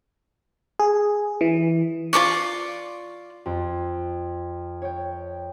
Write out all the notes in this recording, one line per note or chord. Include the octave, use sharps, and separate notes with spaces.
G#4
E3
F4 A#4 D5 C#6
F2
C#5 G5